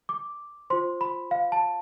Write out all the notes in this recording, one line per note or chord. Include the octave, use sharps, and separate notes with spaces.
D6
F4 C5 C6
B5
F5
A5